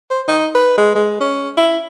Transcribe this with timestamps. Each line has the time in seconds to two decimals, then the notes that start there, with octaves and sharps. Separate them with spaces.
0.10 C5
0.28 D#4
0.55 B4
0.78 G#3
0.95 G#3
1.20 C#4
1.57 E4